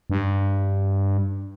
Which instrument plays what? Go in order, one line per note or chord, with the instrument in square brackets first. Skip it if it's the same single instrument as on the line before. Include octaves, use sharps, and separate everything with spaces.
[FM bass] G2